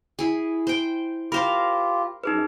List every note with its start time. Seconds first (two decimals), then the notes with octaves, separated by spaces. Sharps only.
0.19 E4 G#4
0.67 C5 G5
1.32 F4 G4 A#4 C5 F5 B5
2.24 F#2 D#4 G#4 B4